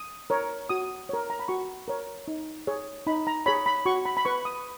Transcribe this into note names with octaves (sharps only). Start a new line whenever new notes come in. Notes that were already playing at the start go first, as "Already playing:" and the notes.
Already playing: D#6
A#4 C#5
F#4 D#6
A#4 C#5
A#5
B5
F#4 C#6
A#4 C#5
D#4
G#4 C#5
D#4 B5
A#5
G#4 C#5 B5
B5
F#4 C#6
B5
B5
B4 C#6
D#6